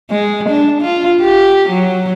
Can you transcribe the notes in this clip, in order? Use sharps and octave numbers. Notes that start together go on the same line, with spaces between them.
G#3
D4
F4
G4
F#3